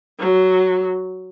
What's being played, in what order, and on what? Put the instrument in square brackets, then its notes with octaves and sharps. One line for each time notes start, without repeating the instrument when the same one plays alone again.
[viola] F#3